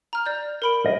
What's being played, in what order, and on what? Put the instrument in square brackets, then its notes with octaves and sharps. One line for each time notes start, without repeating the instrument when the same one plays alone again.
[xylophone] A#5 F6
D5 G6
A#4 B5 D7
[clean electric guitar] D#5